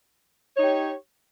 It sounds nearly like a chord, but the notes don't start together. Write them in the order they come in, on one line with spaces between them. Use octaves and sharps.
C#5 D#4 G4